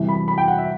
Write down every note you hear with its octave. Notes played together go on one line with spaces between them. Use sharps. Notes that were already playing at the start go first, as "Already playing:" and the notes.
Already playing: C2 C3 E3
B5
B5
G5
F#5
E5